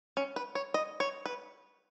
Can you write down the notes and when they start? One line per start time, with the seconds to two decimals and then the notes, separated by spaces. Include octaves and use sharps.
0.17 C#4
0.36 B4
0.55 C#5
0.74 D#5
1.00 C#5
1.26 B4